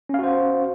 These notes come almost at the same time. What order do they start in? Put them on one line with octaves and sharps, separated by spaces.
C#4 F5 F#4 C5